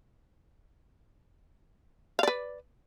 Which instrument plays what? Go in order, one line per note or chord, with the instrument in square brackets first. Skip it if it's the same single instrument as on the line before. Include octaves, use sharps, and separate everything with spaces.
[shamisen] F5
D5
B4